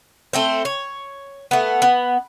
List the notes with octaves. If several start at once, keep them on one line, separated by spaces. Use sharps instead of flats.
A3 C4 C5
C#5
A3 B3
B3